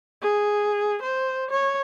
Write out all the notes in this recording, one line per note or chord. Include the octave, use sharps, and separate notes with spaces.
G#4
C5
C#5